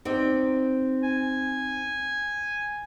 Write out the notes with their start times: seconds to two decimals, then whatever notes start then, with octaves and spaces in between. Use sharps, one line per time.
0.05 C4 D#4 D5
1.03 G#5